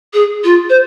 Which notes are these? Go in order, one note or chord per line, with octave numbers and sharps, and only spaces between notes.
G#4
F4
C5